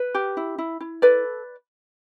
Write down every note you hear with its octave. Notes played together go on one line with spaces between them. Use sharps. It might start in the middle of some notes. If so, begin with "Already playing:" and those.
Already playing: B4
G4
E4
E4
E4
A4 B4 D5